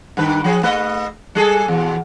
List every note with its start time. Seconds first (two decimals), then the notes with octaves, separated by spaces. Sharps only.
0.17 G2 D#3 B4
0.44 F3 G#4
0.63 A3 B4 D#5
1.35 G3 G#4 A4
1.68 E2 B2